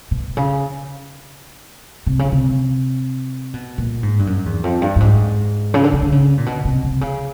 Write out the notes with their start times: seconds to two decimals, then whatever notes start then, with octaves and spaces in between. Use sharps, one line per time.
0.11 B2
0.37 C#3
2.07 C3
2.19 C#3
2.32 C3
3.54 B2
3.78 A#2
4.03 G#2
4.19 G2
4.27 F#2
4.46 E2
4.64 F2
4.82 G2
4.96 G2
5.00 G#2
5.74 C#3
5.83 D3
5.93 C#3
6.02 D3
6.12 C#3
6.38 A#2
6.46 B2
6.65 C3
6.84 C3
7.01 C#3